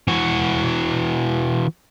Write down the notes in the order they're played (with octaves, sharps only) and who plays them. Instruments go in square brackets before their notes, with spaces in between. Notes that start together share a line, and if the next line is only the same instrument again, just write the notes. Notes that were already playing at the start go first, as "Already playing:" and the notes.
[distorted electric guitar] E3 F#4